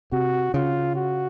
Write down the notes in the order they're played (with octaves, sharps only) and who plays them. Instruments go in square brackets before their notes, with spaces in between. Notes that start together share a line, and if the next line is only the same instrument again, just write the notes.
[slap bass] C3 [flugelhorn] F#4
[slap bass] C#3 [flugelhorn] F4
[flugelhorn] F#4